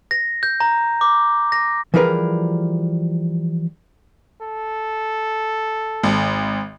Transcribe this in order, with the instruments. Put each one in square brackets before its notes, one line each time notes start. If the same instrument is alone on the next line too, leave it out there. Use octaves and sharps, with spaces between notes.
[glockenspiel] A#6
G6
A#5
D6
A#6
[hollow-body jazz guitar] E3 F3 G3 G#4 A#4 B4
[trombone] A4
[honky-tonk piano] G#1